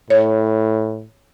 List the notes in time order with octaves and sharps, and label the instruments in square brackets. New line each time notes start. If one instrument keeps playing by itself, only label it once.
[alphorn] A2 [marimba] C#5